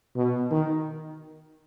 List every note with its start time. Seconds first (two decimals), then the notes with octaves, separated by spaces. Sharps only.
0.16 B2
0.51 D#3